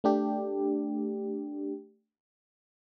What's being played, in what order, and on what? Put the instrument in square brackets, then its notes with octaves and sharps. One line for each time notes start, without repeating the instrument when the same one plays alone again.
[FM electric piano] A3 D4 G4